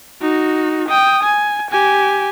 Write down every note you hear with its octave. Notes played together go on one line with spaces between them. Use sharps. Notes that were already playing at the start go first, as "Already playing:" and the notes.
D#4 F#4
G5 D#6
G#5
G4 G#5